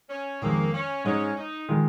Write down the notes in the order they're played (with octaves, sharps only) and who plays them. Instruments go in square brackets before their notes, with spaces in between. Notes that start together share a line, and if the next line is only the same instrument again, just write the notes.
[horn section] C#4
[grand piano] F2 D#3 G#3 [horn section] A#3
[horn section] C#4
[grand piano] G#2 G#3 D#4 [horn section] C#4
[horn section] D#4
[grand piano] D#3 G#3 F4